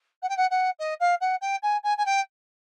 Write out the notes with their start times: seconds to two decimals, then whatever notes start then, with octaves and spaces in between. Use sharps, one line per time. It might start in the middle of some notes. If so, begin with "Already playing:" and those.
0.22 F#5
0.29 G5
0.37 F#5
0.50 F#5
0.79 D#5
1.00 F5
1.21 F#5
1.41 G5
1.62 G#5
1.83 G#5
1.97 G#5
2.06 G5